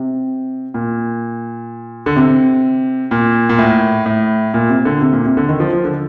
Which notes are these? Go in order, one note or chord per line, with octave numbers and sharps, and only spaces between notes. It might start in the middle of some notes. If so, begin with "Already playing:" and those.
Already playing: C3
A#2
D3
C3
A#2
A#2
A2
A2
A#2
C3
D3
C3
A#2
C3
D3
D#3
F3
F3
D3